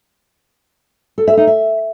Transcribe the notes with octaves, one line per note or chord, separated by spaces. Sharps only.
A4
E5
D#4
E5